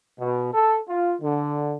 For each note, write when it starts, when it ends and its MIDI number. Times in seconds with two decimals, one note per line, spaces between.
0.20 0.51 47
0.53 0.78 69
0.89 1.14 65
1.22 1.77 50